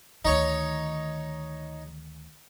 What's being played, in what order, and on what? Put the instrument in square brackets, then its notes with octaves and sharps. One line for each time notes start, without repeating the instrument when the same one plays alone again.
[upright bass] D2 D#3 [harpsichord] D#4 C#5